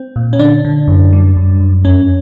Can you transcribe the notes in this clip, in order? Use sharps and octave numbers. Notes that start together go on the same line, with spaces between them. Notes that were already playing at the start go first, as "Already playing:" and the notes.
Already playing: C4
A#2
C#4
D3 D4
D3
F#2
G3
F#2
F#2
F2 C#4